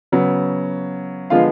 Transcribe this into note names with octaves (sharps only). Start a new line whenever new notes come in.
C#3 F#3 B3
D3 F3 G#3 B3 F4 F5